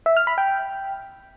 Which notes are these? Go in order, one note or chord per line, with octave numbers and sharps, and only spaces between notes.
E5
F6
B5
G5